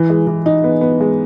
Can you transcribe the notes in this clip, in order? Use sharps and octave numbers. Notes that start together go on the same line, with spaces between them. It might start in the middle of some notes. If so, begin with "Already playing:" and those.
Already playing: E3
G#3
E3
D#4
B3
B3
G#3